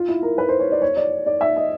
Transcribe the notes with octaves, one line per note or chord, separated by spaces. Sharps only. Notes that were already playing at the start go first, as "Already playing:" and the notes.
Already playing: F4
E4
A#4
B4
C5
C#5
D5
C#5
D5
D5
E5
D#5